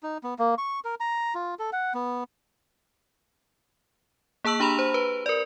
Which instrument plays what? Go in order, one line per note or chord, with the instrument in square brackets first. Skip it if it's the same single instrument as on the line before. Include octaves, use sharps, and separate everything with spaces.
[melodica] D#4
B3
A#3
C#6
A#4
A#5
F4
A4
F#5
B3
[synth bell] A#3 G#4 A5 E6 F#7
D4 G4 A#5 B5 F7
C5
B4
A#4 D5